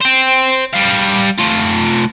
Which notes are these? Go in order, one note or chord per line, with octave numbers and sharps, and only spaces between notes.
C5 G5
G3 F5
A3 F4